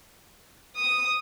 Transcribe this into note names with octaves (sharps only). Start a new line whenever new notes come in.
D#6